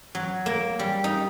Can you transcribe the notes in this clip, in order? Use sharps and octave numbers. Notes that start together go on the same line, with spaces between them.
F#3
A#3
G3
D#4